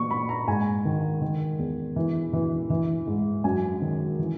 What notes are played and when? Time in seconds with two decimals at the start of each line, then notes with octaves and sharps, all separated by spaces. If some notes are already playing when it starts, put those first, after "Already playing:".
Already playing: A#2 E3 C#6
0.11 A#2 B5
0.29 A#5
0.48 G#2 G#5
0.85 D#3
1.22 D#3
1.59 E2
1.96 E3
2.33 E3
2.70 E3
3.07 G#2
3.44 F#2 G#5
3.82 D#3
4.19 E3